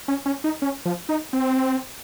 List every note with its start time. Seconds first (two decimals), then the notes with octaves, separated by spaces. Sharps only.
0.08 C#4
0.26 C#4
0.44 D#4
0.62 C#4
0.85 F3
1.09 D#4
1.33 C4